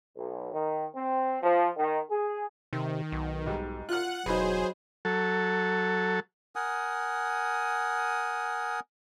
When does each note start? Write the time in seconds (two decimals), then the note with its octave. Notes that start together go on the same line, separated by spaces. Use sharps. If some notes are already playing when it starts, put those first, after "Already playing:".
0.17 B1
0.53 D#3
0.95 C4
1.42 F3
1.76 D#3
2.11 G#4
2.73 C3 D#3
3.12 B1
3.46 G#2 G3
3.89 F4 F#5 F6 F#6
4.26 E1 F#3 D#4 G#4 B4 C5
5.05 F#3 A4
6.56 A#4 F#5 G#5 D#6